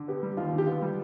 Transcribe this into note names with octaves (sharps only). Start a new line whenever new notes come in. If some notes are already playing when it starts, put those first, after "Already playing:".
Already playing: D3
B3 G4
G3
D#2 F4
D3
G4
B3 F4
G3